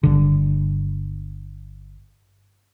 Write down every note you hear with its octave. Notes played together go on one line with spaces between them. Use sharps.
G1 D3